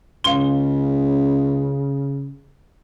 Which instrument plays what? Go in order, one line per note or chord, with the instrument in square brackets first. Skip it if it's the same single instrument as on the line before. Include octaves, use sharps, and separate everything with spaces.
[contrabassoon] C#2 [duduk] C#3 [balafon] F5 C6 [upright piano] G7